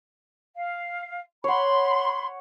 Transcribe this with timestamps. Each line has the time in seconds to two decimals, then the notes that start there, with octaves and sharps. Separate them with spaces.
0.55 F5
1.44 C#5 F#5 B5 C6